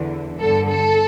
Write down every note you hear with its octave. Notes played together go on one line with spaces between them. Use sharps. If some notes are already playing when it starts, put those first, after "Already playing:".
Already playing: E2 D3
G1 G2 D3 A4
A4